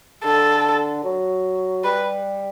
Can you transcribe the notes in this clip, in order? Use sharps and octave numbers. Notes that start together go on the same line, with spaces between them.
D3 A4
F#3
G3 B4